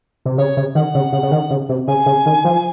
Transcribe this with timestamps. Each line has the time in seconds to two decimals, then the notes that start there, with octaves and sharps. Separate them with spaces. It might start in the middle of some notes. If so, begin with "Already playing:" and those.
0.25 C3
0.38 C#3 C#5
0.57 C#3
0.75 D#3 F#5
0.95 C#3
1.12 C#3
1.23 C#3
1.31 D#3
1.50 C#3
1.69 C3
1.88 C#3 G#5
2.06 C#3
2.26 D#3
2.44 F3